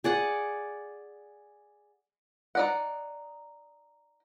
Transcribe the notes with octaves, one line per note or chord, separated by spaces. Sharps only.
G#4 D5 F#5
D#4 D5 F#5